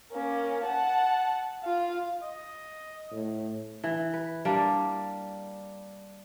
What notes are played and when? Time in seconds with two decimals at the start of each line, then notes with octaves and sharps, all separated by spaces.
0.12 A#3 C#4
0.64 F#5 A5
1.64 F4 F5
2.23 D#5
3.12 A2
3.84 E3
4.13 B4
4.45 G3 A#3 D4